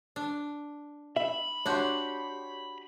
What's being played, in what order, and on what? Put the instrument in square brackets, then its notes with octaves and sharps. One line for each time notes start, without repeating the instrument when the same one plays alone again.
[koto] D4
[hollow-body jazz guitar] E5 [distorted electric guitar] B5
[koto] D4 F#4 G4 [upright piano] C#5 C6